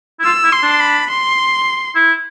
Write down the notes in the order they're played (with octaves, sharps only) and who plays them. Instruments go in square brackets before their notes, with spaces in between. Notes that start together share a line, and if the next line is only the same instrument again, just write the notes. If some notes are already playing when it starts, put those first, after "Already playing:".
[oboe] E4
[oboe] F4 [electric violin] E6
[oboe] E4
[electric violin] C6
[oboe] D4
[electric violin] B5
C6
[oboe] E4